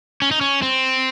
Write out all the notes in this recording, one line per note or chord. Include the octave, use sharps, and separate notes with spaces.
C#4
D#4
C#4
C4